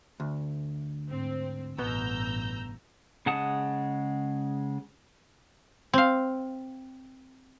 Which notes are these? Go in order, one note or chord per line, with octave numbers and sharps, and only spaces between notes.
D2
G#2 C4
A1 G2 B2 B3 A#5 E6 G6
C#3 G#3 F#5 A5 D#6
C4 F5